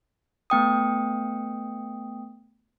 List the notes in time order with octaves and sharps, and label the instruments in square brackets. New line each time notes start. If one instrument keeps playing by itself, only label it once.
[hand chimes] A3 B3 G5 D#6